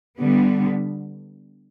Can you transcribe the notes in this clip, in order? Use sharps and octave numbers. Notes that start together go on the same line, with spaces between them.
D3 G3 B3